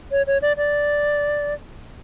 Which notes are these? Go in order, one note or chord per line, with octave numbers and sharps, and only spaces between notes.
C#5
C#5
D5
D5